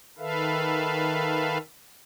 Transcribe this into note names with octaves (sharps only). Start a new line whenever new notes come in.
D#3 A4 B4 E5 F5